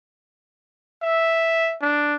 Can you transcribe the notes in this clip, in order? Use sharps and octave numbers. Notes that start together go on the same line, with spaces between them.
E5
D4